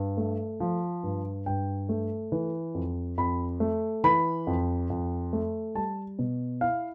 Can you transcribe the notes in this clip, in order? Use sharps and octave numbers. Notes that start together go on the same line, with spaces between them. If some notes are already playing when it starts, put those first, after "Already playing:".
Already playing: G2
A3
F3
G2
G2 G5
A3
E3
F2
F2 B5
A3
E3 B5
F2
F2
A3
G3 A5
B2
E4 F5